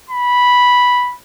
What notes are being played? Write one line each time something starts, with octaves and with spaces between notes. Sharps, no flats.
B5